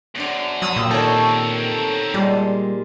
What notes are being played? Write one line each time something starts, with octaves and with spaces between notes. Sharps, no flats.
F#2 B3 D4 C5
F#3 D#6 E6
A#2 G4
D#3 C4 D#4 A4 C#5
A#2 G3 G#3